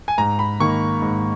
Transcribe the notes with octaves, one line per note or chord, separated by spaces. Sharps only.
G#5
G#2 A#5
B5
D#3 A#3 C#6
G#2